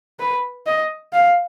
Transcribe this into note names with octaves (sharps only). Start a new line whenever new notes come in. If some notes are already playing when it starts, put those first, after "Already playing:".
B4
D#5
F5